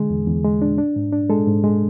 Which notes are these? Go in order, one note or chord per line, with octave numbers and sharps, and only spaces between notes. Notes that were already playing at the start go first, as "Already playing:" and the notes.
Already playing: D3 G#3 G#4
E2
E2
G#3
D4
D4
G#2
D4
G#3 A4
G#2
G#3